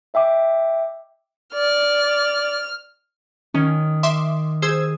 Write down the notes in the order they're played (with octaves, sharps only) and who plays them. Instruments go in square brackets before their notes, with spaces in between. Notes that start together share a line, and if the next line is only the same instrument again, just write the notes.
[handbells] D#5 E5 G5 D6
[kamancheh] D5 [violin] F6
[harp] D#3 [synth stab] C#4
[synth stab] E5 C6 D6
[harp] G#4 [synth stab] C5 E6 G#6